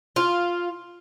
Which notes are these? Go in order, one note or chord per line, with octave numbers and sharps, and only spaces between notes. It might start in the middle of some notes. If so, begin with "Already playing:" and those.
F4